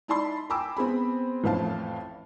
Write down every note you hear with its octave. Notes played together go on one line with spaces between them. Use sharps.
D#4 E4 D5 A5 B5 C6
G5 G#5 A#5 B5 D6 E6
B3 C4 G#4 B5
A1 F2 A2 C5 F5 A5